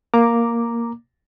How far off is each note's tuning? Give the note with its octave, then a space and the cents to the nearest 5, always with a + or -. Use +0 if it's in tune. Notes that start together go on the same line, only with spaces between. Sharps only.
A#3 +0 A#5 +0 D6 +0